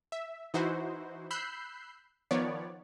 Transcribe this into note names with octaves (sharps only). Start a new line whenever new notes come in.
E5
E3 D#4 E4 F#4 C5
B5 E6 F#6 G6 C7
D#3 F3 B3 C#5 D5